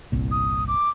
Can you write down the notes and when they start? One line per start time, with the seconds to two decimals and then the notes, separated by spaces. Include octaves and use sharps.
0.12 G1 C2 A#2
0.31 D#6
0.68 D6